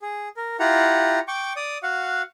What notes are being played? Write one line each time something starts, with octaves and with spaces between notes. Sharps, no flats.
G#4
A#4
E4 F4 G4 F#5 A#5
G5 C#6 D6
D5 D#6
F#4 F5 F#5